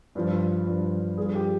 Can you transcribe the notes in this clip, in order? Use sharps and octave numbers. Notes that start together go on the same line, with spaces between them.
G2 F3
G2 F3
G2 F3 G#4
G4